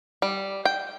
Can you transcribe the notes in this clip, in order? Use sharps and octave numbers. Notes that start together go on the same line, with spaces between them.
G3
G5